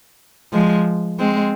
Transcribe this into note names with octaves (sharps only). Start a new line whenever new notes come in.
F3 G#3
G#3 C4